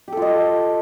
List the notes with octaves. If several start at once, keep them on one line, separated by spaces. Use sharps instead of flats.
F4 G4 A4 D#5